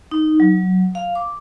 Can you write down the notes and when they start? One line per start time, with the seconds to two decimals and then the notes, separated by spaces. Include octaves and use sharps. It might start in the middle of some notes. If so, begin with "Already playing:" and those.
0.11 D#4
0.40 F#3
0.95 F5
1.15 D6